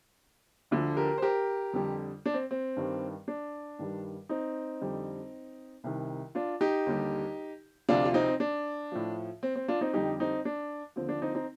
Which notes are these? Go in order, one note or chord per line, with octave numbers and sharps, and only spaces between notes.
D2 D3 F3
G4 A#4
C5
G4 A#4
F2 D3 G3
D4
C4
C4
G2 D#3 G3
D4
G2 D#3 G3
C4 D#4
F2 D3 G3
C2 C3 D#3
D4 F4
D#4 G4
D#2 D3 G3
D2 C3 F3 D4 F4
F4
C4 D#4
D4
A2 F3
C4
C4
D4 F4
C4 D#4
F2 D3 G3 D#4 G4
C4 D#4
D4
D#2 D3 F3 C4
D4
C4 D#4
C4 D#4